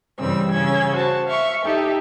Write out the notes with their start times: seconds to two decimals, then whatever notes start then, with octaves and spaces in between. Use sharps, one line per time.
0.18 G2 C#3 E3 G3 C4 E6
0.51 C#3 C#4 E6 G#6
0.94 F#4 C5 A5
1.25 E5 F5 C#6
1.63 D#4 G4 A4 E5